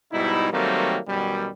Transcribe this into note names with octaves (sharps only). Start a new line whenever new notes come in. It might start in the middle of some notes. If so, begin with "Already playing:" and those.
G#2 B2 G3 D#4 E4
D#3 F#3 G3 A3 A#3 C4
F#2 B2 D#3 G3